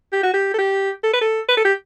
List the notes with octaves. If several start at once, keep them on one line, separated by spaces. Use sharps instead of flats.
G4
F#4
G4
A4
G4
A4
B4
A4
B4
A4
G4